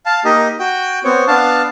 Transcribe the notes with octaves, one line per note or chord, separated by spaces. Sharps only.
F5 A5
A#3 D#4 G4 D#5
F#4 G5
B3 C4 C#5
B3 D4 F5 A5